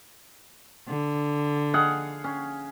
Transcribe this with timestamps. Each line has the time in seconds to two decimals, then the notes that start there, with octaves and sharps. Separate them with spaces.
0.88 D3
1.74 G#4 F5 F#5
2.24 C#4